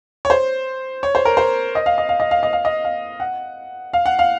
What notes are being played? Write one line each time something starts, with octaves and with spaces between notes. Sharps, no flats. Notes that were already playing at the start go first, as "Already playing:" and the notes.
C#5
C5
C#5
C5
A#4
C5
D#5
F5
D#5
F5
D#5
F5
D#5
F5
D#5
F5
F#5
F5
F#5
F5